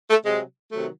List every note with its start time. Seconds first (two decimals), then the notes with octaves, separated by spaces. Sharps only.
0.10 A3
0.25 C3 F#3 G#3
0.71 C3 D#3 F#3 A3